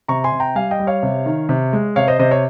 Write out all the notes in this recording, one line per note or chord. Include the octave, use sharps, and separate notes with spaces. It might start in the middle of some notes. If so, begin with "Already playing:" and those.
C3 A#5 C#6
G#5 C6
C3
G5 A#5
G3 F5 G#5
D#5 G5
G3
C#5 F5
C3
D#3
C3
G#3
C3 C#5 F5
C5 D#5
C3 C5 D#5
C#5